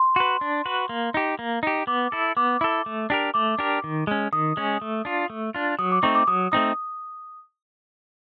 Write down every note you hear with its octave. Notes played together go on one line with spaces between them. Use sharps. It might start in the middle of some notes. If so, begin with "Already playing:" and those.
Already playing: C6
F#4 B4
D4
F#4 B4
A#3
D#4 G4
A#3
D#4 G4
B3 D6
E4 A4
B3 D6
E4 A4
A3
D4 G4 A#4
A3 D6
D4 G4 A#4
D#3
G#3 C#4
D#3 D#6
G#3 C#4
A3
D4 F4
A3
D4 F4
F#3 D#6
D6
A3 C4 D#4 C#6
D6
F#3 D#6
A3 C4 D#4 D#6